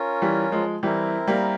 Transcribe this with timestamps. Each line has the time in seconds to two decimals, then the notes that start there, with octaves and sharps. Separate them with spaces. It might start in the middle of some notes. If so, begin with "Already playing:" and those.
Already playing: C#4 F4 A#4 C#5
0.22 E3 G3
0.52 F3 G#3
0.83 E3 G3 C4 E4 A#4
1.28 G3 A#3